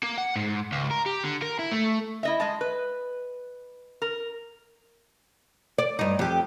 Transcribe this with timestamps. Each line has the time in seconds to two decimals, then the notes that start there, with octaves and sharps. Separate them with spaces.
0.03 A#3
0.18 F#5
0.36 G#2
0.72 C#2
0.91 A#4
1.06 G4
1.23 D3
1.42 A#4
1.59 E4
1.71 A3
2.23 E4 D#5 E5
2.40 G#3 D#5 A5
2.61 B4
4.02 A#4
5.78 D5
5.99 G2 D#4
6.19 F2 G4